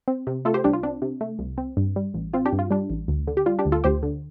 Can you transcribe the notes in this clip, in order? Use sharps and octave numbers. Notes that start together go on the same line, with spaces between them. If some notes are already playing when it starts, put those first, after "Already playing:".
C4
C3
A3 F4 A4
G4 C5
C2 D4 G4
F4
C4 D4
C3
A3
C2
C4
G2
G3
A1
C4 F4
D4 G4
G2
F4
G3 D4
A1
D2
D3
G4
G3 F4
D4 G4
D2
F4 A4
D2 G4 C5
D3